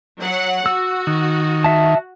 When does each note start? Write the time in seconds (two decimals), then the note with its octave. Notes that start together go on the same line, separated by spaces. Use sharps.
0.19 F#3 F#5
0.66 F#4 E6
1.07 D#3
1.64 E5 A5